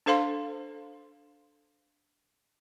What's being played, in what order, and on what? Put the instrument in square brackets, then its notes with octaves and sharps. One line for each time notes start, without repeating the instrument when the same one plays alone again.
[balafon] D4 A4 C5 F5 C6